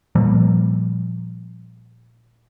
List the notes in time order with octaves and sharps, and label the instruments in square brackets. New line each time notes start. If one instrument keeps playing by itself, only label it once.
[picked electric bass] A#2 F3 G3 A#3